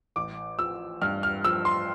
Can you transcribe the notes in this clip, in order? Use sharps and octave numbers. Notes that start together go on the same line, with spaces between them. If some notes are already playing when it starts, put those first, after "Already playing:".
A1 D6
F3 E6
G2 F6
F6
F3 E6
C6